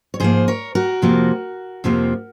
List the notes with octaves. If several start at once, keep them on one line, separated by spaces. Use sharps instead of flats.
C#5
G#2 F3 A#3 G#4 C5
A#4 C#5
F#4 A#4
F2 C3 F3 A#3
F2 C3 F3 A#3